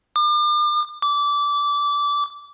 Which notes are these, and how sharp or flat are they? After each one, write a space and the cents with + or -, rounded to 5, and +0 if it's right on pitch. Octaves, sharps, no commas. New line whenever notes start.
D6 +40
D6 -20